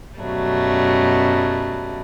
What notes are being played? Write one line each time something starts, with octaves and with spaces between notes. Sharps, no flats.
F#2 B2 F#3 G3 A3